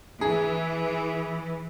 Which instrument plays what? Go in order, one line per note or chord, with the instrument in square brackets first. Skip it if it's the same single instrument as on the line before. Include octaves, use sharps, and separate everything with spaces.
[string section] E3 [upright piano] G#4